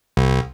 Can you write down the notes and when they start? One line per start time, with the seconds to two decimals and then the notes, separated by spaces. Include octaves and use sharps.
0.17 C2